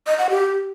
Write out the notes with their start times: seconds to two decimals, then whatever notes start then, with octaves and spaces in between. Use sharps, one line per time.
0.07 D#5
0.18 F#5
0.30 G4